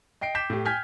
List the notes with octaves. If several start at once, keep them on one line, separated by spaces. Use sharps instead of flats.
D#5 G5 C7 D7
G5 D6 G6 B6 E7
A2 G4
G5 G#5 F6 G6 G#6 B6